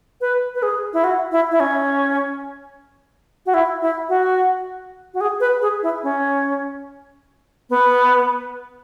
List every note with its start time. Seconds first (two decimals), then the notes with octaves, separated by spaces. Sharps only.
0.21 B4
0.55 B4
0.63 G#4
0.93 E4
1.04 F#4
1.32 E4
1.51 E4
1.60 C#4
3.46 F#4
3.54 E4
3.82 E4
4.09 F#4
5.14 F#4
5.21 G#4
5.40 B4
5.62 G#4
5.83 E4
6.03 C#4
7.70 B3